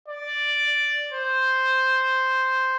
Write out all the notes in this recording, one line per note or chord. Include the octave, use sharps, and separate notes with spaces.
D5
C5